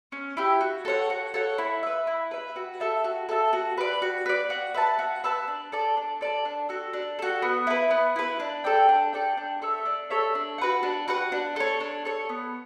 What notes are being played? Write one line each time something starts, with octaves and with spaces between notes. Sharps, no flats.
C#4
E4 G4
F#4
A4 C#5 F#5
F#4
A4 C#5 F#5
E4
B4 E5
E4
B4 E5
F#4
A4 E5 A5
F#4
A4 E5 A5
F#4
B4 D5
F#4
B4 D5
F#4
B4 E5 A5
F#4
B4 E5 A5
D4
A4 D5 A5
D4
A4 D5 A5
D4
F#4 A4
D4
F#4 A4
B3
E4 B4
B3
E4 B4
D4
A4 D5 G5
D4
A4 D5 G5
D4
A4 C#5 E5
D4
A4 C#5 E5
D4
F#4 B4 F#5
D4
F#4 B4 F#5
D4
A4 C#5
D4
A4 C#5
B3